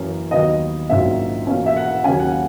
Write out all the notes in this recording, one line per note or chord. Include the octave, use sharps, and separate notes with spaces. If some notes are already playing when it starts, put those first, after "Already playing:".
Already playing: F#2 E3 A#3 C#4
D#2 D#3 F#3 B3 D#5
A#1 G#2 F#3 A#3 C#4 E5
E2 B2 A#3 C#4
E5
F#5
D#2 C#3 F#3 C#4 G#5
F#5